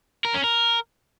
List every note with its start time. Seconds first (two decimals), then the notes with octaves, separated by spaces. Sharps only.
0.25 A#4
0.34 C#4
0.44 A#4